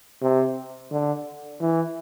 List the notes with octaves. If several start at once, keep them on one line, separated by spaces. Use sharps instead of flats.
C3
D3
E3